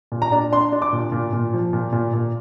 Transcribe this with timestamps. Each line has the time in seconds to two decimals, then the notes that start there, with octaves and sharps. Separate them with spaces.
0.12 A#2
0.22 A#5
0.32 D4
0.52 D4 C6
0.72 D4
0.82 D6
0.93 A#2
1.12 A#2
1.33 A#2
1.53 F3
1.73 A#2
1.93 A#2
2.13 A#2